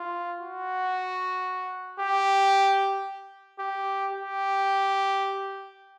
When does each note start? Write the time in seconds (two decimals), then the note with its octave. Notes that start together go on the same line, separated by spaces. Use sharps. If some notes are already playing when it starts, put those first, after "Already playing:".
Already playing: F4
0.41 F#4
2.00 G4
3.59 G4
4.13 G4